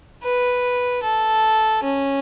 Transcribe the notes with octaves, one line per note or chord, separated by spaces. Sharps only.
B4
A4
C#4